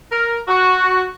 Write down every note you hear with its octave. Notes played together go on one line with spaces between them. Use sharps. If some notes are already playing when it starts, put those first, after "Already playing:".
A#4
F#4